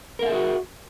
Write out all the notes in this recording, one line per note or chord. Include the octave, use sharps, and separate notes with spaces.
F#4 G#4 A#4 E5 F5